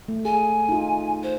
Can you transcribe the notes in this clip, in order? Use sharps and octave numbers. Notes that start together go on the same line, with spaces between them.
A3
G#4 G#5
D#4 F4
C5